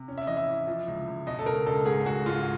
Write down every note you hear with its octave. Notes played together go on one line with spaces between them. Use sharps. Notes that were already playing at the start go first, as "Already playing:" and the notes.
Already playing: C3
C#4
E5
E3 D#5
E5
E3
F3
C#2
C#2
B2 D#5
A4
C#2 A#4
C#2 A4
G#2 G#4
G#2 F#4
G#2 F4